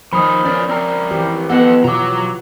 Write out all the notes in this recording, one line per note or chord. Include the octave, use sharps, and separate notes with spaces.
A#2 D#3 F3 D#4 B5 D#6
C#4 A#4 B4 D5
C4 A#4 D5 A#5
E3 G4
B3 A4 B4 D#5 F#5 A5
B2 F#3 F4 A#5 D6